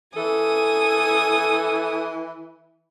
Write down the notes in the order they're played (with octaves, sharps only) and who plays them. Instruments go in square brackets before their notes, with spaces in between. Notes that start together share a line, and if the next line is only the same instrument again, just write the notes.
[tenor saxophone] E3 [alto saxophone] A4 [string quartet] G#5 D#6